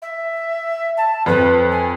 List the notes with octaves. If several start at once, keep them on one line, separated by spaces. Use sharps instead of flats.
E5
A5
F2 B4
G#5